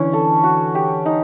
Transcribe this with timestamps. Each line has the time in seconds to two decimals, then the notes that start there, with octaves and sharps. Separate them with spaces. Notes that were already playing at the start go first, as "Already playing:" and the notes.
Already playing: D3 E3 C#4
0.13 A4
0.44 F#4
0.75 G4
1.06 D#4